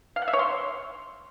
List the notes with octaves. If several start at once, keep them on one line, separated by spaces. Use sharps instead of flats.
F5
F#5
E5
C#5
C6